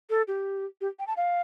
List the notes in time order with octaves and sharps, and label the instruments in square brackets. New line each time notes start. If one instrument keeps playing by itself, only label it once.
[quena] A4
G4
G4
G5
A5
F5